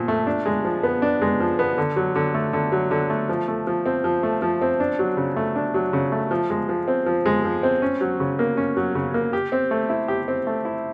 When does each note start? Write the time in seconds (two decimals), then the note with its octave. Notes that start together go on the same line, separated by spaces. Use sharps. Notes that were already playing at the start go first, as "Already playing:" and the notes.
Already playing: A#2 F3
0.08 A3
0.27 D4
0.46 G#3
0.64 F3
0.83 B3
1.02 D4
1.22 G#3
1.40 F3
1.59 B3
1.78 D3
1.96 F#3
2.15 D3
2.34 A3
2.53 D3
2.72 F#3
2.91 D3
3.10 A3
3.29 F3
3.48 A3
3.67 F3
3.86 C4
4.04 F3
4.23 A3
4.42 F3
4.61 C4
4.80 D4
4.99 F#3
5.17 C#3
5.37 A3
5.56 D4
5.74 F#3
5.93 C#3
6.12 A3
6.31 F3
6.50 G#3
6.69 F3
6.88 C4
7.06 F3
7.26 G#3
7.44 F3
7.63 C4
7.82 C#4
8.01 F#3
8.20 C#3
8.39 A#3
8.57 C#4
8.77 F#3
8.95 C#3
9.14 A#3
9.33 G4
9.52 C4
9.71 A3
9.90 E4
10.08 G4
10.28 C4
10.47 A3
10.65 E4